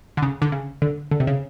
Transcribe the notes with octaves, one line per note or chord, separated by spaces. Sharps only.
D3
C#3
D3
C#3
D3
D3
C3
C#3